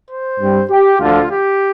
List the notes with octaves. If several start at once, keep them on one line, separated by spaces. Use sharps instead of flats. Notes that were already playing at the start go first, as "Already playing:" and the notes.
C5
G2 G3 C4
G4
D2 D3 F3 F4
G4